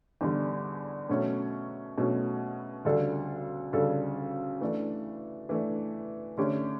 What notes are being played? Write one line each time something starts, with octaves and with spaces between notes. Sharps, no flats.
E2 D3 G3
B2 F#3 A3 C#4
B2 F#3 A3 C#4
D2 C#3 G3 D4 A4
D2 C#3 G3 D4 A4
E3 A3 D4
E3 A3 D4
D3 A3 C#4 G4